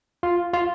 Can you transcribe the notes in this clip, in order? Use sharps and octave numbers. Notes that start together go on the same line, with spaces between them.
F4
F4